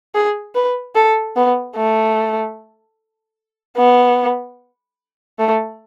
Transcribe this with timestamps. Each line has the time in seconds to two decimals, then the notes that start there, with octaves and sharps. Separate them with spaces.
0.15 G#4
0.55 B4
0.95 A4
1.36 B3
1.76 A3
3.77 B3
5.39 A3